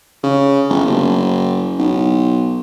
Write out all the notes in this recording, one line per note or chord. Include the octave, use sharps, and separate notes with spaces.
C#3
G1
F#1
B1